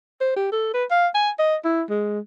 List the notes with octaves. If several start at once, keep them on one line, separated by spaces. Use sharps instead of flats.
C5
G4
A4
B4
F5
G#5
D#5
E4
G#3